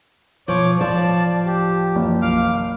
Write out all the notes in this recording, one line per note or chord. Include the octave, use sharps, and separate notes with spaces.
B2 F3 C#5 D6
D1 F3 D5 A5
G4
F#1 D#3 E3
B1 C3 F5 D6 F6